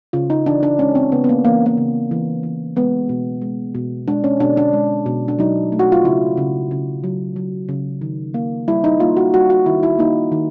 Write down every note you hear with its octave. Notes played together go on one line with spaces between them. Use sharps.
C#3 F4
D#4
E3 D4
D4
G#3 C#4
C4
C#3 B3
B3
A#3
E3 A#3
A#3
C#3
E3
E3
G#3 B3
B2
G#3
B2
G#3 D4
C#4
B2 D4
D4
G#3
B2
D4
F#3 D#4
A3
F#4
F4
C#3 E4
C#3
C#3
F#3
F#3
C#3
D#3
A#3
G3 E4
D#4
A#3 F4
F#4
G3 F#4
F#4
D#3 E4
E4
A#3 D#4
D#3